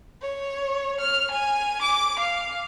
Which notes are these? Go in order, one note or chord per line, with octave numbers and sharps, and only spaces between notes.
C#5
F6
G#5
D6
F5